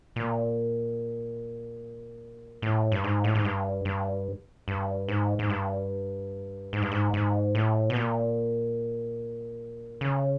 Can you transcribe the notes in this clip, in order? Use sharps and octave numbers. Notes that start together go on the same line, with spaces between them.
A#2
A2
G2
G#2
A2
G#2
G2
G2
G2
G#2
G#2
G2
G#2
G2
G#2
G#2
A2
B2
A#2
C#3